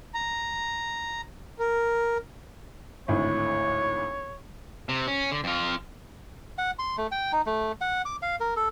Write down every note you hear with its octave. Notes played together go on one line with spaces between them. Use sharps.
A#5
A#4
G#1 D2 A2 C#5
C3
C#4
D3
F2 F4
F#5
C6
A3
G5
D#4
A3
F#5
D6
F5
A#4
A4